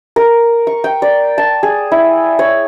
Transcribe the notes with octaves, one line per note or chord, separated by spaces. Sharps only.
A#4
C#6
G5
D5
A5
G#4
E4
C#5